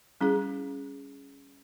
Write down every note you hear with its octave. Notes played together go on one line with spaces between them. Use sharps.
G3 C#4 E4 G#4